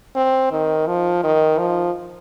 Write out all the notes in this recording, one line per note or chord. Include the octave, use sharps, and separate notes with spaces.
C4
D#3
F3
D#3
F3